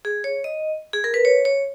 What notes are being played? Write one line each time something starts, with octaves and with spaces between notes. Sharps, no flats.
G#4
C#5
D#5
G#4
A#4
B4
C#5
C#5